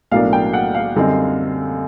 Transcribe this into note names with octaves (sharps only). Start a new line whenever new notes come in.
B1 A2 F#3 A#3 D4 F5
G5
F#5
F5
F#2 D3 G3 C4 D#4